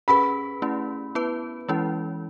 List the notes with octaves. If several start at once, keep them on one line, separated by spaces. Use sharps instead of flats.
C#4 G#4 B4 B5
A3 C#4 E4
B3 E4 B4
E3 G#3 C#4 E4